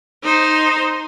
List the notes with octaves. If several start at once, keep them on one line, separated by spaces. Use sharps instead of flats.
D#4 C5